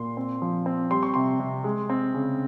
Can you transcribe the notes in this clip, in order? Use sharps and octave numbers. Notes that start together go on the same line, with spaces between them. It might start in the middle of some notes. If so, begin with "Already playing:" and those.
Already playing: A#2 C6
C4
F3
C4
G3 C6
C#6
C3 C6
C3
G#3
C4
C#3